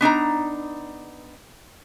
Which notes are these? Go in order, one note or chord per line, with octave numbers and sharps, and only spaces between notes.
B3 D4 D#4 A#5